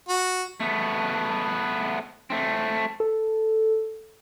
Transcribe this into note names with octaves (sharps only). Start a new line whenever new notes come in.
F#4
A3 B3
A3 C4
A4